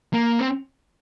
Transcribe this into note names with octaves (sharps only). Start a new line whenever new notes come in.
A#3
C4